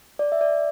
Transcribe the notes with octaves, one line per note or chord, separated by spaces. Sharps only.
D5
E5
D5